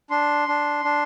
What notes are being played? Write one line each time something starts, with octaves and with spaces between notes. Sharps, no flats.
D4 C6
D4
D4